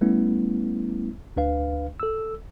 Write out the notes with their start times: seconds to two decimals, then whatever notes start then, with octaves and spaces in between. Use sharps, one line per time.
0.01 G3 A3 B3 C#4 E4
1.36 D2 D4 B4 F5
2.00 A4 E6